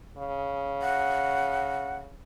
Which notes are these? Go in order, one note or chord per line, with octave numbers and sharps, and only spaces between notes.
C#3
F#5